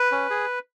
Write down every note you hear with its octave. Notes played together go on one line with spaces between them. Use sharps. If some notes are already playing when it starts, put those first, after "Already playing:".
Already playing: B4
C#4
G#4